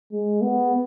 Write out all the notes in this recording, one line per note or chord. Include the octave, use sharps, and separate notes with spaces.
G#3
B3